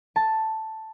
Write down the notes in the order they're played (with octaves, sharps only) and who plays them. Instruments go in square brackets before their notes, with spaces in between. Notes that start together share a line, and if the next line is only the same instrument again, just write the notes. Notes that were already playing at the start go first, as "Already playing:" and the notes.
[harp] A5